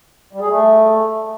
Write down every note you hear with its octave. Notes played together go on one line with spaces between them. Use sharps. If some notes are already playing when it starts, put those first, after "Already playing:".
G3
G#4
A3